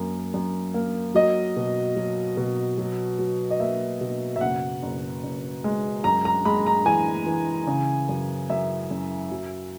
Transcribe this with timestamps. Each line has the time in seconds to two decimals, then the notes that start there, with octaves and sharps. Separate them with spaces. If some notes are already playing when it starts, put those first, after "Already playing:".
Already playing: F#2 A#3
0.34 F#2
0.74 A#3
1.15 F#3 D#5
1.57 B2
1.96 F#3
2.37 B2
2.78 F#3
3.19 F#3
3.50 D#5
3.60 A#3 E5
4.01 B2
4.36 E5
4.41 F#1 F#5
4.83 F#1
5.23 F#1
5.64 G#3
6.04 F#2 A#5
6.25 A#5
6.45 G#3 B5
6.66 A#5
6.86 E3 G#5
7.26 E3
7.67 C#3
8.09 F#2
8.50 F#2 E5
8.91 F#2
9.31 F#3